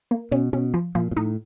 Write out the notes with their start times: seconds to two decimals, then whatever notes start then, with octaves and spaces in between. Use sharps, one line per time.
0.11 A#3
0.31 B2 C#4
0.53 B2 C#4
0.74 F3
0.95 A#2 F3
1.11 A#2
1.16 A2 D#4